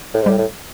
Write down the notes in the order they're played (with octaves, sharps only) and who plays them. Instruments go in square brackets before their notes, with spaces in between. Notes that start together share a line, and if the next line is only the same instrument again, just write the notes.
[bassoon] A2
G#2
[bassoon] A2 [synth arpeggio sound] G3
[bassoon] A2